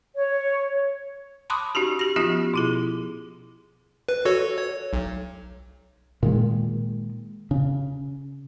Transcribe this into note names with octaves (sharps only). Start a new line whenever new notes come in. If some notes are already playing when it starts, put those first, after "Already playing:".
C#5
A5 B5 C6 D6 D#6 F#6
C#4 D#4 F#4 G4
G4 A#6
F3 B3 C#4 D#4 F4 G4
B2 E4 G#4
B4
F#4 A4 C#5
C#5
B1
A#2 D#3 G#3
C#3